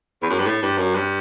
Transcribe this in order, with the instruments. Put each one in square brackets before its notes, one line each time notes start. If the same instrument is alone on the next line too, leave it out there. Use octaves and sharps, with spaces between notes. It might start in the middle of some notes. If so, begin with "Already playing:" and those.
[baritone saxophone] E2
F#2
G2
A2
G2
F#2
G2